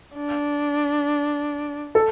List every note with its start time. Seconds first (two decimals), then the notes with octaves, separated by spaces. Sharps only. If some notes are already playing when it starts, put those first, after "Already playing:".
0.17 D4
1.95 A4